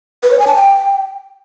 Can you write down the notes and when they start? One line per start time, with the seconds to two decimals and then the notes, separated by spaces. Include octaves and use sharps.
0.23 B4
0.31 C#5
0.39 G#5
0.47 A5
0.55 G5